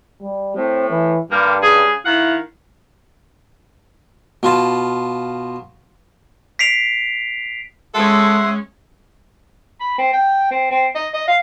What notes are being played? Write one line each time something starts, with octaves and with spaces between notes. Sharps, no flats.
G3
A2 C4
E3
G2 D3 G3 A#3
C#3 G#4
D#3 E4 F5 F#5
B2 F4 A5
B6 C7 D7 F7
G#3 C#4 A4 E5 F#5 C6
B5
C4
G5
C4
C4
D#5
D#5
F5